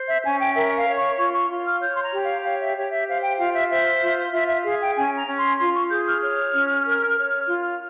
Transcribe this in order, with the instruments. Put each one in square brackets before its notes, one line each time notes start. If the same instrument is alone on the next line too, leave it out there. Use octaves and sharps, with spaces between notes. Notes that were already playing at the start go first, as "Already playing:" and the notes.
Already playing: [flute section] C5
E5
C#4 G#5
G5
A#4 E5
F5
C#5
C#6
F4 C#6
C#6
F4
F6
C#5 G6
C6
A#5
G4
F5
C#5 F5
E5
G4 C#5
E5
C5 F5
G5
F4 F5
E5
C5 E5
F4
F4 E5
E5
G#4 F5
G5
C#4 G#5
A#5
C#4
C6
F4 C6
C#6
G#4 G6
F6
C#5 F6
C#4
A#4
C#5
F4